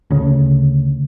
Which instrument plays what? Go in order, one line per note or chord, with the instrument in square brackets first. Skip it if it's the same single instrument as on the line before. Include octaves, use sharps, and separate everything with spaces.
[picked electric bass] D2 C#3